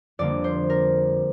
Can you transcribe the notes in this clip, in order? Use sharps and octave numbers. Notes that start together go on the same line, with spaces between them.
F2 D3 G3 A#3 D5
C5
A#4